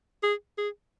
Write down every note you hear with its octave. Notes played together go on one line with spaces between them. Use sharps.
G#4
G#4